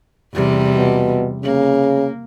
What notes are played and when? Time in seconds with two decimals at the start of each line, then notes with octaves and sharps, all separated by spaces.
0.34 E2 C3 G3
0.73 B2
1.44 C#3 A#3